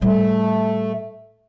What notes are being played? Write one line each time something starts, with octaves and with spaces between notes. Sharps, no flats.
A2 G3 A3